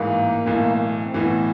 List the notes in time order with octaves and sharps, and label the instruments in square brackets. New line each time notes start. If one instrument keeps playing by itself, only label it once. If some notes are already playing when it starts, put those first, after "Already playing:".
Already playing: [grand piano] A1 G#2 E3 [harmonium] A#3
[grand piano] B1 A2 E3
[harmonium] C4
[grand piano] B1 A2 E3 [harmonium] B3